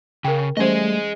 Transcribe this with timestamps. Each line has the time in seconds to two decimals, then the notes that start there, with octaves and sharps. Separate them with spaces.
0.24 C#3 A#4 G5
0.57 E3 G3 A3 C#4 G#4 C5 D#5